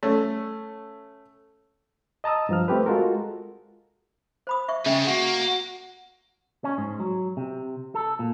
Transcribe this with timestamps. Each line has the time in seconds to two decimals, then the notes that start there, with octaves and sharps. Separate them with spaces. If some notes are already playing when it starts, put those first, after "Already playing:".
0.03 A3 C#4
2.24 D#5 A5 A#5 D#6 E6
2.49 G2 F3 F6
2.68 A3 C4 G4 B4
2.86 G#3 F4 F#4 A4 A#4
4.47 C5 B5 D#6
4.68 E5 C#6
4.86 C#3 G3 G#3 E5 G5
5.07 A#3 F#4
6.64 C#4
6.78 G#2
7.00 F#3
7.37 C3
7.95 A4
8.19 A#2